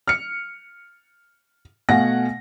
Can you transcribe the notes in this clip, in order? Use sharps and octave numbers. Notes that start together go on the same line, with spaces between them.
F6 C#7
B2 A3 F5 F#5 G#5 A#6